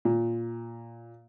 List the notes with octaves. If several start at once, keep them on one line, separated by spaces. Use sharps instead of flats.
A#2